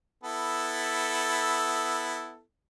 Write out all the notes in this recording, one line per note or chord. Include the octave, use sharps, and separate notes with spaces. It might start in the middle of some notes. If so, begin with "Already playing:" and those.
B3 E4 A4